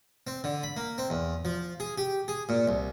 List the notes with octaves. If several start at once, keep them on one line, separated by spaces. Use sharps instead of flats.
C4
D3
B5
A#3
C4
E2
F3
G#4
G4
G#4
A#2
C2